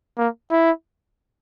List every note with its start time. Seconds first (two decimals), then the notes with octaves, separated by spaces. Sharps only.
0.18 A#3
0.51 E4